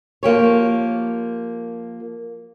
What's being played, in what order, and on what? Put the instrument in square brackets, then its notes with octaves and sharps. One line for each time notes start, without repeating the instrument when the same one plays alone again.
[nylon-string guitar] F3 A#3 G4 C#5